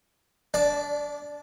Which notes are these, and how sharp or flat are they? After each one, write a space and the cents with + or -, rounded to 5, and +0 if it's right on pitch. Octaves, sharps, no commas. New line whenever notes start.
D4 -25 D5 +0